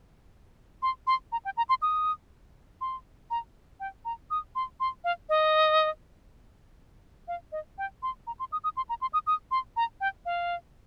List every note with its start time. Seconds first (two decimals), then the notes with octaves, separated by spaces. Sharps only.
0.82 C6
1.07 C6
1.32 A#5
1.45 G5
1.57 A#5
1.69 C6
1.82 D#6
2.81 C6
3.31 A#5
3.80 G5
4.05 A#5
4.31 D#6
4.55 C6
4.80 C6
5.04 F5
5.29 D#5
7.28 F5
7.52 D#5
7.78 G5
8.03 C6
8.27 A#5
8.39 C6
8.52 D#6
8.64 D#6
8.77 C6
8.89 A#5
9.01 C6
9.14 D#6
9.27 D#6
9.51 C6
9.77 A#5
10.01 G5
10.26 F5